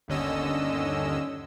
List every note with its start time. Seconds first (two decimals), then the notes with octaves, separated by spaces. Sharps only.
0.08 G1 D#2 D3 C#4 D#5 E6